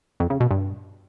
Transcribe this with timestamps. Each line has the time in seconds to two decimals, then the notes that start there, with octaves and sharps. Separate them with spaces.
0.20 F2
0.30 C#3
0.40 B2
0.51 G2